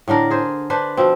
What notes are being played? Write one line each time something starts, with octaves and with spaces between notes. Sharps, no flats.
A2 D3 D4 A#4
G#4 C5
D4 B4 C5
B2 F3 C4